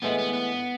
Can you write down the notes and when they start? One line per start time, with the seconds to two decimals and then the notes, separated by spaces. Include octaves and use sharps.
0.02 A2 E3 G#3 B3
0.19 B3
0.33 B3